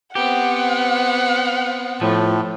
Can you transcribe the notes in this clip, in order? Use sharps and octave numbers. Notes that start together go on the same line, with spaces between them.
B3 C4 G4 F#5
A2 F3